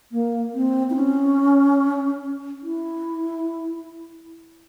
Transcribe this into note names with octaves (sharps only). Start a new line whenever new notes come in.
A#3
C4
E4
C#4
E4